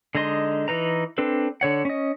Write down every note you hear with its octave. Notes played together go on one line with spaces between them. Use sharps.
D3 G#3 D#4 D#5 C6
E3 D#4 B4 A#5
C4 D4 A4 B4
D3 C#5 F#5
C#4 D#5